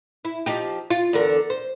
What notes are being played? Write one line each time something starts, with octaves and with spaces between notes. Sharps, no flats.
E4
F3 D#4 G4
F4
E2 D3 A#4
C5